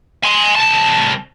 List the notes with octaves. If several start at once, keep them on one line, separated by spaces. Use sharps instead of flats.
G#5 C6
C2 A5